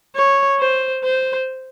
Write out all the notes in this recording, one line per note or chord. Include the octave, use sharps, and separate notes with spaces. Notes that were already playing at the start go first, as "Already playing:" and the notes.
C#5
C5
C5